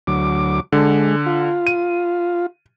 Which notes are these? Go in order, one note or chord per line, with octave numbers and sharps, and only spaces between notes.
D2 F#3 D6
D3 G#3
F4
D#7